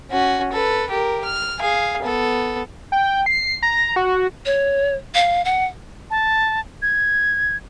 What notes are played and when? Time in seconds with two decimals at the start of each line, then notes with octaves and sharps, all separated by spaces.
0.11 C#4 F#4
0.53 A4 B4
0.90 G4 A#4
1.25 F6
1.60 G#4 F5
2.03 B3 A4
2.92 G5
3.26 C7
3.63 A#5
3.96 F#4
4.46 C#5
5.15 F5
5.45 F#5
6.10 A5
6.82 G#6